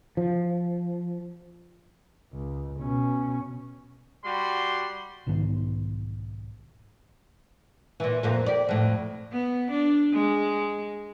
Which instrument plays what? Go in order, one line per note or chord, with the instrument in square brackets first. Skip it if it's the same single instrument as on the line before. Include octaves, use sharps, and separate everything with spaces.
[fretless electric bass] F3
[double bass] C#2
B2 C#4
[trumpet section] G3 F#4 C6
[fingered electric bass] B1 G#2 D#3 B3
[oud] A#2 E3
F2 A#2 A#3
G4 D5
F2 A2
[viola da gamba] B3
D4
G#3